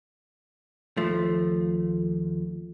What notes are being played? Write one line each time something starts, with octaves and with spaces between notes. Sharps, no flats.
D#2 F3 A3